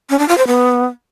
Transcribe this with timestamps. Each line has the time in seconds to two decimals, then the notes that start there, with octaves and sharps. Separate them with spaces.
0.10 C#4
0.19 D4
0.28 F4
0.38 C5
0.47 B3